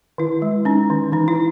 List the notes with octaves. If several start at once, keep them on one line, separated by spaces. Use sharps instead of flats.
D#3 E4
G#3
C#4 D#4
D#3
E3 D#4
E4